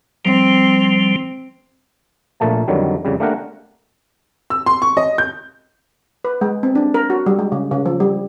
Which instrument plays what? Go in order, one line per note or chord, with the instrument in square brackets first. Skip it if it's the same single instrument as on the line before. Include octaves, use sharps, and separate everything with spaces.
[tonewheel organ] F3 G3 [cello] C4
[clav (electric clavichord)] A#1 A#2 A3 A#3 A5
F2 D3 D#3 F#3 G3
F2 C#3 G3
A3 A#3 D4 G4 A#4 F#5
[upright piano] E6
C6
C#6
D#5
G6
[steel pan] B4
G#3
C4
D4
A#4
F#4
G3
G#3
C#3
C#3
F3
G3